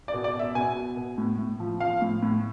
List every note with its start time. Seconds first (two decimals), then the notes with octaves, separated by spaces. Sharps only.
0.08 D5
0.13 B2
0.24 D5
0.35 B2 E5
0.55 B2 G#5
0.76 B2
0.97 B2
1.18 A2
1.39 A2
1.60 F3
1.80 F3 F5
2.02 A2
2.23 A2